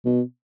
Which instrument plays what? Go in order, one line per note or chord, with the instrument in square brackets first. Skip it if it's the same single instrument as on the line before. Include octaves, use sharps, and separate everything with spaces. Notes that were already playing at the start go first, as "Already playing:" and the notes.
[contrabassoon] B2